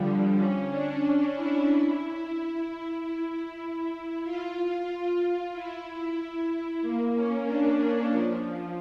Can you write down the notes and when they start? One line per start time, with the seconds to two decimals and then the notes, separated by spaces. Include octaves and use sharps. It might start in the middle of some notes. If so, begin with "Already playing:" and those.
Already playing: D3 F3 G3
0.38 C#4
0.70 D4
1.02 D4
1.34 E4
1.67 E4
4.24 F4
5.53 E4
6.82 A#3
7.13 C#4
7.45 D4
8.11 F3